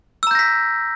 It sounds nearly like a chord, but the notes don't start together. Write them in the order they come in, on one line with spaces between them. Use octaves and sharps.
E6 A#5 G6 A#6 B6